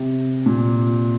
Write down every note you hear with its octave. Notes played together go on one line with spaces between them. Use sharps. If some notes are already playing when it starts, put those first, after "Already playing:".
Already playing: C3
A#2